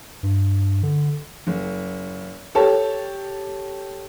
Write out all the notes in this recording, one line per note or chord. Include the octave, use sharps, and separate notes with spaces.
G2
D3
F#1
G4 A4 C#5 A5